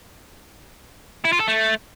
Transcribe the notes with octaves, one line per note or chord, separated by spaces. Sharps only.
E4
F4
A4
A3